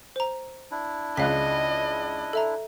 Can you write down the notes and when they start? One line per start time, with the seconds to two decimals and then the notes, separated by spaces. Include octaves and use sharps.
0.16 C5 A#5
0.71 D4 E4
1.17 C#2 D#5 F5 F#6 B6
2.33 A4 E5 A#5